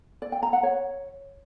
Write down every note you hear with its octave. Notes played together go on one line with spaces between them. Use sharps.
D5
G5
A#5
F#5
C#5